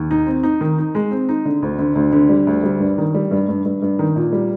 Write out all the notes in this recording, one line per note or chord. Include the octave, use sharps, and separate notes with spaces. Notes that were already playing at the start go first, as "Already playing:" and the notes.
Already playing: D#2
D#4
C4
D#4
D#3
D#4
G#3
C4
D#4
D3
D2
D3
D2
D3
G3
D2
G3
G2
D#3
G3
G2
G2
G2
G2
D#3
A#2
G3